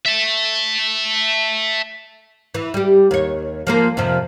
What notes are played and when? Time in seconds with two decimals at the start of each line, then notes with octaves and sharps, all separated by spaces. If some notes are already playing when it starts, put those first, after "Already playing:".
0.06 E5 A5
2.54 E3
2.74 G3 G4
3.11 D#2 C#5
3.67 F3 A#3 C5
3.97 F2 C3 F3